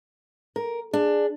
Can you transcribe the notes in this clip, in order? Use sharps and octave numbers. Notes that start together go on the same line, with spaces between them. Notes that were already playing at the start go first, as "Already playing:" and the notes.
A#4
D4 G#4